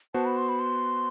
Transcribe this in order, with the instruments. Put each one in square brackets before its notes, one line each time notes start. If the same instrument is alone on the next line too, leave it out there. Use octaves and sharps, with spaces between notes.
[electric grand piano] B3 F#4 C5 [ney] A5
[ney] B5
C6
B5
C6